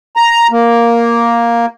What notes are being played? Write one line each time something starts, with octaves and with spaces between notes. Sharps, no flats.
A#5
A#3